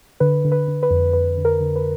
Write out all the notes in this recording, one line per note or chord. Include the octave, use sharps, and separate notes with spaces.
D3 B4
D3
B4
D3
B4
F2
F2 B4
D3
A#4
D3
B4